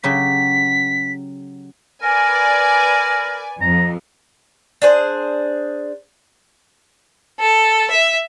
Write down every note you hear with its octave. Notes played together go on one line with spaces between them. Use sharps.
C#3 F#3 G4 B6
A#4 B4 D5 G#5
F2 F3 A#5
D4 G#4 C5
A4
E5